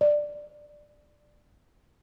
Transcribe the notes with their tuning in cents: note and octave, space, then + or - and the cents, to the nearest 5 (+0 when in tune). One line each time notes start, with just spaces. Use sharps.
D5 +10